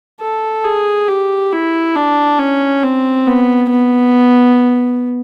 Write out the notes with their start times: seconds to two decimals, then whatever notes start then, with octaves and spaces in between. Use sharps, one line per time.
0.21 A4
0.64 G#4
1.08 G4
1.53 E4
1.95 D4
2.39 C#4
2.83 C4
3.27 B3
3.70 B3